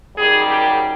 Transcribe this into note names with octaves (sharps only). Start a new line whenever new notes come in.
F#2 D#3 G3 G#4
G4